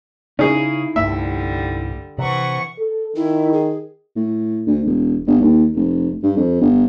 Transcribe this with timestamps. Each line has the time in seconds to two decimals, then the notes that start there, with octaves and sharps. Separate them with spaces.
0.39 C#3 C#4 D#4 E4 G#4
0.96 C2 G2 D3 G3 A3 E5
2.18 C3 E3 F#5 C#6
2.79 A4
3.16 D#3 E4
3.53 G#4
4.16 A2
4.67 D2
4.85 E1
5.27 G1
5.42 D#2
5.75 F1
6.23 G2
6.36 F2
6.61 G1